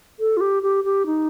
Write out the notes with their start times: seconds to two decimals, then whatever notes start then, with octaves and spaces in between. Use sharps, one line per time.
0.20 A4
0.37 F4
0.41 G4
0.63 G4
0.84 G4
1.06 D#4